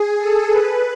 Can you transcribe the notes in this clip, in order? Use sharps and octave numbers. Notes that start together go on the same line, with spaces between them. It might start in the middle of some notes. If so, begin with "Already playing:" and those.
Already playing: G#4
A4
B4